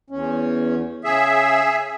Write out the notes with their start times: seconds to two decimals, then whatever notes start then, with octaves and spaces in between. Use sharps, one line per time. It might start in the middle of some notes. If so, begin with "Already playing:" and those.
0.10 E2 C#4
1.04 C#3 G#4 E5